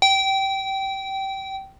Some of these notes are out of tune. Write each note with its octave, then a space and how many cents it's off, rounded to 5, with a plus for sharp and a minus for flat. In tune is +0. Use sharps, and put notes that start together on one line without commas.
G5 -20